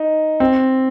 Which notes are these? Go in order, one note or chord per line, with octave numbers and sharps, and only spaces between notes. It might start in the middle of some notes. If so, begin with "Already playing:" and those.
Already playing: D#4
C4